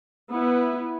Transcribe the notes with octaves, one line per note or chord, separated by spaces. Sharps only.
B3 E4 B4